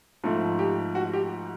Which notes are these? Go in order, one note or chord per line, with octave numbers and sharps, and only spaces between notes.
G#2 F3 A3
G4
F#4
G4